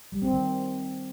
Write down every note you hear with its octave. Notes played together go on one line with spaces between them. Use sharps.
G3
C4
D#3